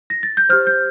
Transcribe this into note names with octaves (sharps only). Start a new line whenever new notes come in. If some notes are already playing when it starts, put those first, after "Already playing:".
A#6
A6
G6
G4 C5 F6
G6